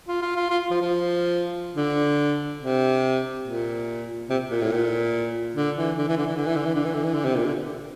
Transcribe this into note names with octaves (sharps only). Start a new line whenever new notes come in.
F4
F4
F4
F4
F3
F3
D3
C3
A#2
C3
A#2
A2
A#2
D3
E3
D3
E3
D3
E3
D3
E3
D3
E3
D3
E3
D3
E3
D3
C3
A#2
D3